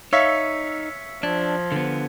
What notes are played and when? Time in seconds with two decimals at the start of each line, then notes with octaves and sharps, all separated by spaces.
0.13 D#4 C#5 E5 F5 E6 B6 C#7
1.23 F3 D4 G#6
1.72 D3 B3